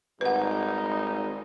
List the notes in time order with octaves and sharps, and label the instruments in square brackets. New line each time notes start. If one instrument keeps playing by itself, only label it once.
[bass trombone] G#1 [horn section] G3 D#4 [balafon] B4 F#5